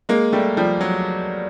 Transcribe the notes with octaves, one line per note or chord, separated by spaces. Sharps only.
G#3 A#3
G3 A3
F3 G3
F#3